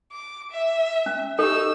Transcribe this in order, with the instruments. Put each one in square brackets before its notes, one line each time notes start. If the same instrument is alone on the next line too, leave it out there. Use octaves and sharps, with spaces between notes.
[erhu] D6
E5
[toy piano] C#4
[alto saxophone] D#4 [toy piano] G4 A4 [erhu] E6